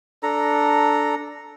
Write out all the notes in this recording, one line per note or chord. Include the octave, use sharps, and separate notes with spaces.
D4 A4 A#5